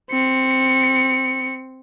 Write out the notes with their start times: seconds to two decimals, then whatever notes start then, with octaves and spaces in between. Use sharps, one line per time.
0.11 C4 C#7